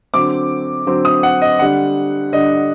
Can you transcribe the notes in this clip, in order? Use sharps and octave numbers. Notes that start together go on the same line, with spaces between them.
D3 F#3 C4 D6
D3 F#3 C4
D#6
F#5
D#5
D3 G3 D4 F#5
D3 G3 D4 D#5